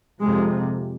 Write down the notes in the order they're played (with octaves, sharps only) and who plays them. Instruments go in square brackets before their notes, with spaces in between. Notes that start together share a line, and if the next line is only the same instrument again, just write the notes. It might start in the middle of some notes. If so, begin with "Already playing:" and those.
[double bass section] F2 C3 G#3